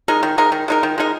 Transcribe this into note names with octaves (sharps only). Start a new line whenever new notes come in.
G#3 D#4 A#4
D#3
G#3 D#4 A#4
D#3
G#3 D#4 A#4
D#3
G#3 D#4 A#4